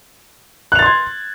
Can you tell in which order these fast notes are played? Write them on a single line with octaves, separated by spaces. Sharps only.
F#6 F7 A6 C6 G#6